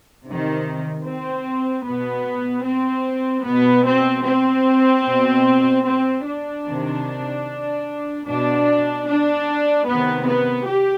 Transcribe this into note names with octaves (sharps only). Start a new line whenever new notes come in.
C3 D#3
C4
B2 B3
C4
B2 B3
C4
C4
B2
C4
D4
C3 D#3
B2 D4
D4
C3 D#3 B3
B3
G4